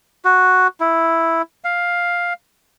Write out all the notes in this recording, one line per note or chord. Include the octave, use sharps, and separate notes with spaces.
F#4
E4
F5